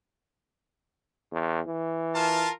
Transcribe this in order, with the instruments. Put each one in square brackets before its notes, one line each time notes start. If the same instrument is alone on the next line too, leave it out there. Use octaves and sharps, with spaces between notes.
[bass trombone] E2
E3
[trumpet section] F4 A#4 A5